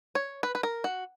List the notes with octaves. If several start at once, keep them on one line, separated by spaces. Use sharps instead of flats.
C#5
B4
B4
A#4
F#4